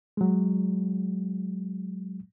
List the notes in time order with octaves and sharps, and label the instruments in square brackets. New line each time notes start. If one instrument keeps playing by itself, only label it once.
[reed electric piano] F#3 G#3